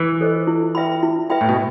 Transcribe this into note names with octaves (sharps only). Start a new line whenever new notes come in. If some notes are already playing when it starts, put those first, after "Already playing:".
Already playing: E3
A4 C5 D#5
E4
B4 E5 G5 B5
E4
B4 E5 G5 B5
A2
B2